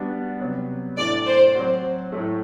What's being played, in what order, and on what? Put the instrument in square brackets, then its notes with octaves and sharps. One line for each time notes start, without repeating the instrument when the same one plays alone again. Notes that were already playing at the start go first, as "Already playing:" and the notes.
Already playing: [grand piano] G3 B3 D4 F#4
C3 F#3 B3
[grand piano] A2 E3 A3 D4 [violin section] D5
[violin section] C5
[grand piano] F#3 C4 F#4
A2 F#3 A3